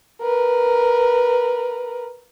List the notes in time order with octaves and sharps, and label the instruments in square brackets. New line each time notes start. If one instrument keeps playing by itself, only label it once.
[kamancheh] A#4 B4